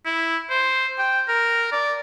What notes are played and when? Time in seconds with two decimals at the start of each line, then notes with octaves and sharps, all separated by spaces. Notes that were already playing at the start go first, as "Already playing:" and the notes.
0.05 E4
0.50 C5
0.98 G5
1.28 A#4
1.72 D5